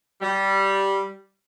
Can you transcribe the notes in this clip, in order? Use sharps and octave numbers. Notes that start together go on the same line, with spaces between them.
G3